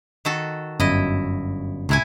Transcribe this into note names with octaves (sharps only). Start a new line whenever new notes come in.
D#3 F#4 A4
G1 F#2 E4 D#5
C#2 A2 E4 G#5